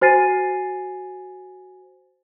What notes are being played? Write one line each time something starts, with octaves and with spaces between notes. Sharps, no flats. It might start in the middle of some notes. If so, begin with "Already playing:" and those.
F#4 C5 G#5 A6 C7 D#7